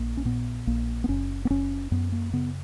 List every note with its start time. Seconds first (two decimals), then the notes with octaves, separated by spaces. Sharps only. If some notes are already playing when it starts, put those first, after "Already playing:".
Already playing: A#1 A#3
0.17 C#4
0.25 A#2 B3
0.67 A#1 A#3
1.04 B3
1.08 F#1 C#4
1.45 B3
1.50 F#1 C#4
1.91 F#2 B3
2.12 A#3
2.33 C#3 B3